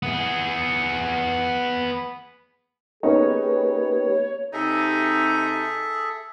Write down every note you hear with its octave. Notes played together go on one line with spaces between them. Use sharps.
B3 G#4
A#3 B3 C#4 D#4 G4 G#4 B4 C#5
C3 D#4 G#4 A4 E5